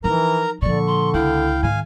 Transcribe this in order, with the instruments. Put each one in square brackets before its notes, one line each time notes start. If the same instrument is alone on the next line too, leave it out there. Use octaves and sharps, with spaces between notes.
[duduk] E3 [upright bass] F3 D#4 [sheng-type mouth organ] A#4 A#5
[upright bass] A#2 F3 [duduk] D3 [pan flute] D5 [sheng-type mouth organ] C#6
[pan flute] C6
[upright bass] C#2 [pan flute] E4 [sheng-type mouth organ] F5 G5
[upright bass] G#2 D#3 [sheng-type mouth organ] F5 G#5